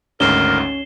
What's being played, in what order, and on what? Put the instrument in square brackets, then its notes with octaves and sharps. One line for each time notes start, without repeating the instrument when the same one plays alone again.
[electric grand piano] G#1 D2 G#2 [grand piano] C#4 [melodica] A#4 [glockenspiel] C7 E7 G7